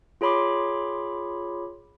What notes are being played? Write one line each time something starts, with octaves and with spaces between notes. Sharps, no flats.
F4 G#4 C#5 B5 C6 D6